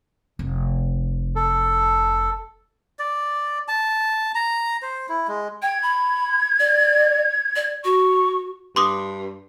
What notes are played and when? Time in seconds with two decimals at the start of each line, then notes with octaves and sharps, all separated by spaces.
0.39 F1
1.36 A4
2.99 D5
3.68 A5
4.35 A#5
4.82 C5
5.09 E4
5.28 G#3
5.62 G5 G#6
5.82 B5
6.59 D5
7.55 D5
7.84 F#4 C#6
8.76 G2 C6 D6 D#6